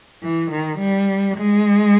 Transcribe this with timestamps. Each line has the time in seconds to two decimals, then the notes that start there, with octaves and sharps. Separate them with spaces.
0.23 E3
0.51 D#3
0.79 G3
1.37 G#3